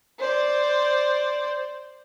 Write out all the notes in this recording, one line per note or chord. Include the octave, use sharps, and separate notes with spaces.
C5 D5